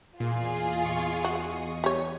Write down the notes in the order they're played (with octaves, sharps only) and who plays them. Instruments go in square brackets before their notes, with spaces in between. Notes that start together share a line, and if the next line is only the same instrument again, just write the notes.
[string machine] E2 D#5 D#6 [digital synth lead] A#2 [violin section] F4 G#4
[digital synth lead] C#6
[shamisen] F#4
G3 C#5